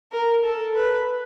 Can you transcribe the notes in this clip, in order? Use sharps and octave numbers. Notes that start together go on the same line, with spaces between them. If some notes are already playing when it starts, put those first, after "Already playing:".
A#4
A4
B4